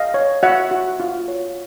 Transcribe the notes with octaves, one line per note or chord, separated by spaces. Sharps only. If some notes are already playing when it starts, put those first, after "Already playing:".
Already playing: D#5 F5
C#5
F#4 E5 F#5
F#4
F4
C#5